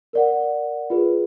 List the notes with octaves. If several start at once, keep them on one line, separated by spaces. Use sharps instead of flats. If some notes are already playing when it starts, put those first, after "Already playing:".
A#4 D5 F#5
F4 G#4 B4